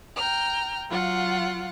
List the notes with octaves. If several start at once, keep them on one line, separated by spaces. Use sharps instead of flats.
G5 A#5 F6
F#3 F4 F5 F#5